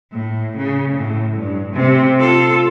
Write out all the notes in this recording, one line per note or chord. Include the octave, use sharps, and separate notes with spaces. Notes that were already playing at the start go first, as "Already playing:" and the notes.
A2
C#3
A2
G2
C3 A3
F4 A4